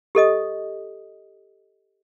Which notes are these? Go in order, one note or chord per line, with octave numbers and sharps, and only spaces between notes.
G4 A4 D#5 D#6